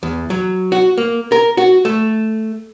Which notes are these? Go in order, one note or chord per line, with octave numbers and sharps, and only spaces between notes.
E2
F#3
F#4
A#3
A#4
F#4
A3